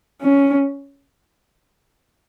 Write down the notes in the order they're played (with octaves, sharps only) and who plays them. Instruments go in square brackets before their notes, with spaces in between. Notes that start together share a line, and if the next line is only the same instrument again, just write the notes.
[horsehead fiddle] C#4